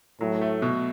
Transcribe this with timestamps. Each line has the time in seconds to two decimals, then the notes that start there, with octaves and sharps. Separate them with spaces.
0.20 A2 F#3
0.41 A3
0.62 B2